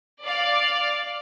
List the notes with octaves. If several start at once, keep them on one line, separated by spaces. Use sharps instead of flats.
D5 F5